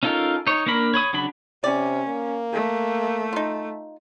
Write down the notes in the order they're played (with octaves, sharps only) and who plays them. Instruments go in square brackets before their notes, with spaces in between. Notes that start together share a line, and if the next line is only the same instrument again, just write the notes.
[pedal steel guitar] C#4 D#4 F4 A4 A#4
D#4 C#5
A#3 D4 A#4 B5
C#5 B5 D#6
C#3 F#3 D4 B5
[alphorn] C3 [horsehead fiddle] C#4 [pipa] D5
[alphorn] A#3
[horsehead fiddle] A3
[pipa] D#4 F4